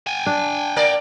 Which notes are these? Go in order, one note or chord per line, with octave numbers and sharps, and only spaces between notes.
G5 G#5
D4
A#3 A#4 D5